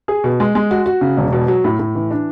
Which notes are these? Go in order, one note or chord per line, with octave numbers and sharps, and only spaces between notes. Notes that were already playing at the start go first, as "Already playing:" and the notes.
G#4
B2
G#3
G#3
F#4
F#4
C#3
E1
B2
F#3
A2
A2
E3
D4